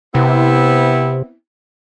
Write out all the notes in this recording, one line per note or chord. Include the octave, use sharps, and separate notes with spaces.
C3 B3 C4 E4